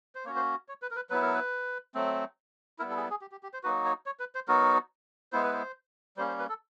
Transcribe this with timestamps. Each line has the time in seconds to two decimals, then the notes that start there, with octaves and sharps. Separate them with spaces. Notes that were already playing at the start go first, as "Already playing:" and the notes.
0.15 C5
0.25 A#3 C#4 F#4 C#5
0.36 C5
0.69 C#5
0.82 B4
0.91 A#4
0.96 B4
1.10 F#3 B3 E4 B4
1.22 A#4
1.34 B4
1.95 F#3 A3 C4
2.79 G3 B3 E4 A#4
2.90 A4
2.97 G#4
3.01 A4
3.10 G#4
3.21 G4
3.32 G4
3.43 G4
3.54 C5
3.63 F#3 A#3 D#4 F#4 B4
3.85 C#5
4.06 C#5
4.20 B4
4.35 C5
4.48 F#3 B3 D#4 F#4 A#4
5.32 G#3 B3 E4 C5
5.43 B4
5.52 C5
6.17 G3 A#3 C#4 C5
6.28 C5
6.39 B4
6.49 A4